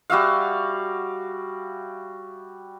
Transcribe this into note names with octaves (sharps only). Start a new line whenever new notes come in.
G3 F#4 E5 F5